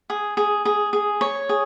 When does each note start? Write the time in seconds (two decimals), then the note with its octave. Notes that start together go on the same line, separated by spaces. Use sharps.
0.10 G#4
0.37 G#4
0.65 G#4
0.93 G#4
1.21 C#5
1.49 G#4